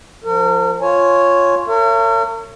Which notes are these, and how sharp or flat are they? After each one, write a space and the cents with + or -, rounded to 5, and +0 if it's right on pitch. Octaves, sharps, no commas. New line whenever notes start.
F3 +0 A#4 -40
F4 +0 C#5 +0 G#5 +20
A#4 -45 C#5 +0 E5 +45